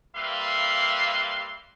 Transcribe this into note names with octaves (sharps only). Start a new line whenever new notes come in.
G3 A#3 B4 E5 F5 C6